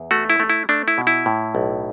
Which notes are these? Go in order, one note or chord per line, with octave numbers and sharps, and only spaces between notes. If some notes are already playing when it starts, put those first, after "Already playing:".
Already playing: E2
A3 F#4
E4
A3
E4
A3 D4
E4
B2
E4
A2
B1